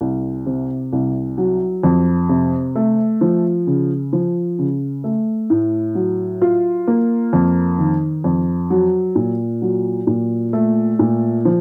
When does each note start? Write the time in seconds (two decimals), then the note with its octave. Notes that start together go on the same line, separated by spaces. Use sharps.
0.01 C2
0.46 C3
0.93 C2
1.38 F#3
1.83 F2
2.29 C3
2.75 A3
3.21 F3
3.67 C#3
4.13 F3
4.59 C#3
5.04 A3
5.50 A2
5.95 F#3
6.42 F4
6.87 A#3
7.33 F2
7.78 D#3
8.24 F2
8.70 F#3
9.15 A#2
9.62 F#3
10.07 A#2
10.53 A3
10.99 A#2
11.45 F3